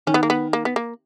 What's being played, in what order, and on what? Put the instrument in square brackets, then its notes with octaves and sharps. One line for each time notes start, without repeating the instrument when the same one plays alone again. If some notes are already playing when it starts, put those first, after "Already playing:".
[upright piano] D#3 [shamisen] C#4
[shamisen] B3
A#3
B3
A#3
B3
A#3